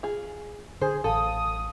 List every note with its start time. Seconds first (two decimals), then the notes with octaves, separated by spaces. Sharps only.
0.03 F4 G#4
0.81 D3 G#4 C5
1.04 A1 A4 F5 A5 D#6